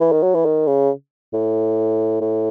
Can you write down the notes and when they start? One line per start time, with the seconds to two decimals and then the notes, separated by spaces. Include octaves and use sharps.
0.01 E3
0.12 D#3
0.23 F#3
0.34 E3
0.45 D#3
0.67 C#3
1.33 A2
2.21 A2